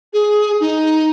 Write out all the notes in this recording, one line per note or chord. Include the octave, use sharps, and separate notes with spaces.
G#4
D#4